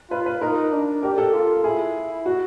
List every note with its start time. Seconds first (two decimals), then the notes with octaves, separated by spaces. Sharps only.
0.10 F4 B4
0.26 B4
0.41 D#4 A#4
0.72 D4
1.03 G4 A#4
1.18 A4
1.33 F4
1.64 E4 G#4
2.26 F#4